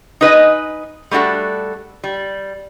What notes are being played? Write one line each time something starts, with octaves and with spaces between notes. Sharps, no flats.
D#4 B4 D#5 G#5
G3 A3 D4 F#4 A4
G3